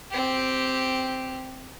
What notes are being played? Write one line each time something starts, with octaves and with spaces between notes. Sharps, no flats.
C4 G4